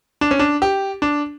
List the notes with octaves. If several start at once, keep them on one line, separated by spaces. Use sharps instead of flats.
D4
C#4
D4
G4
D4